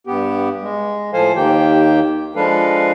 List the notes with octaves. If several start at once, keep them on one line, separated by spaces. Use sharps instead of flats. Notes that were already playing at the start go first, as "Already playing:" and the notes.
G2 B3 G4
G#3
A2 F3 A4 C5 F5 G#5
D#2 D#3 A#3 G4 G5
F3 G#3 D4 A4 B4 F5